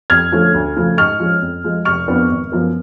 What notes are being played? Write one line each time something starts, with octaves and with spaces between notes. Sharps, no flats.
F2 F6 G#6
D3 F3 A3 C#4
D2
C#3 F3 A3
G#2 C#6 F6
F3 G#3 C#4
F2
F3 G#3
F1 C#6 F6
F2 F3 B3 D4
G#1
F#2 F3 B3